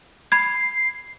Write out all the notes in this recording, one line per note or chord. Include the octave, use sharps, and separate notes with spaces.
B5 G#6 C7